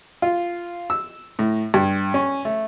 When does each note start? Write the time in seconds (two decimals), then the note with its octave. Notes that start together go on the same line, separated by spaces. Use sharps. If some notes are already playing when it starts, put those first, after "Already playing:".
0.22 F4
0.90 E6
1.39 A2
1.74 G2
2.14 C#4
2.45 A3